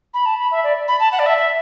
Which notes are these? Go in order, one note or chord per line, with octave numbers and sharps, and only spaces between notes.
B5
A5
B5
E5
D5
B5
A5
F#5
D5
E5
E5